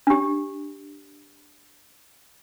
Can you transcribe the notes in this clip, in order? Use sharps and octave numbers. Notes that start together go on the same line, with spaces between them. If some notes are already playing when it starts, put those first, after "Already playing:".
D4 G4